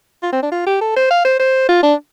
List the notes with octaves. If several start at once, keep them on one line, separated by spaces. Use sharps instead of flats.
F4
C4
D4
F4
G4
A4
C5
F5
C5
C5
F4
D4